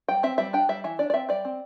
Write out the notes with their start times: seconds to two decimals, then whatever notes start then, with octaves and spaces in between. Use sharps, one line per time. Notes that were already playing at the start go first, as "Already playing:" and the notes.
0.08 G3 G5
0.23 C4 E5
0.38 G3 E5
0.53 D4 G5
0.69 G3 E5
0.84 E3 E5
0.99 D4 D5
1.10 D5
1.14 C4 E5
1.29 G3 D5
1.45 C4